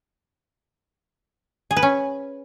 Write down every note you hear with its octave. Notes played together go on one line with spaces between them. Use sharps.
G#4
B4
C#4